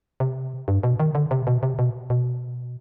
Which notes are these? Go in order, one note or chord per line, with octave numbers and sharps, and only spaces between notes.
C3
G2
B2
D#3
D3
C3
B2
C3
B2
B2